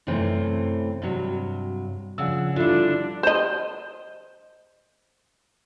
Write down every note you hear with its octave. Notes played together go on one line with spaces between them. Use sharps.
F#2 C3 E3 A3 C4
G2 C3 F#3
C#3 F3 D4 F#5 E6
D3 G3 D4 E4 F4
C5 D#5